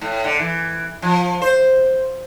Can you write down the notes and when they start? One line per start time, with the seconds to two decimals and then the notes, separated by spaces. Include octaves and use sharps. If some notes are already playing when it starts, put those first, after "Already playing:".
0.01 A2
0.24 D3
0.39 E3
1.02 F3
1.42 C5